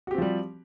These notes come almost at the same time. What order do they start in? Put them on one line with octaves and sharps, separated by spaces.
F#4 G4 C4 F3 G3